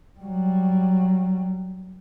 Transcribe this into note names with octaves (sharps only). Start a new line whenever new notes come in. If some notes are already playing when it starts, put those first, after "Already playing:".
F#3 G3